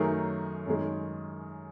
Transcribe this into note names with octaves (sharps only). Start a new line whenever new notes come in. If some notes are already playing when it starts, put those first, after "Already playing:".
Already playing: F#2 D#3 F#3 A3 G#4 A#4
F#2 D#3 G#3